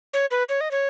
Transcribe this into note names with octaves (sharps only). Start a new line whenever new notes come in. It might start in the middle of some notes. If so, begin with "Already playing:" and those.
C#5
B4
C#5
D#5
C#5